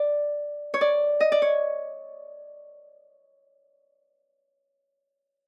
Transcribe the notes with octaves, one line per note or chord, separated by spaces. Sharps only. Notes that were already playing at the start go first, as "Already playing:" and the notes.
Already playing: D5
C#5
D5
D#5
D5
C#5